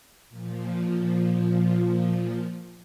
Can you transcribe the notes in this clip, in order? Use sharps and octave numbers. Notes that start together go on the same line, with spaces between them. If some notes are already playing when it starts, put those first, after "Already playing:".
A#2 F3